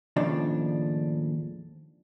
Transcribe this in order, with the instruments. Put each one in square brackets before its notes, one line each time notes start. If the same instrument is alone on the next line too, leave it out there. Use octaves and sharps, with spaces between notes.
[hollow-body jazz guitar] D#2 A2 C#3 F3 D4